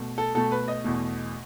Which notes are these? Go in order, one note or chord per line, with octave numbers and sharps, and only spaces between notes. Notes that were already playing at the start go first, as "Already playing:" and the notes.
Already playing: B2 A3
A4
B2 A3 A4
B4
D#5
E2 B2 A3